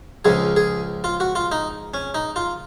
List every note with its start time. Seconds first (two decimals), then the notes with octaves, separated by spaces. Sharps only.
0.25 C#2 C#3 F3 G#4
0.56 G#4
1.04 F4
1.20 F#4
1.35 F4
1.52 D#4
1.94 C#4
2.14 D#4
2.36 F4